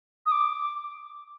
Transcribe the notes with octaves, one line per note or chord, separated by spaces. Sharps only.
D#6
D6